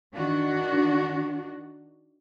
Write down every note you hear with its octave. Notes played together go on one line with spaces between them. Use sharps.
D#3 D4 F#4